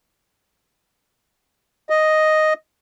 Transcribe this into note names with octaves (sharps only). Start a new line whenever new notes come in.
D#5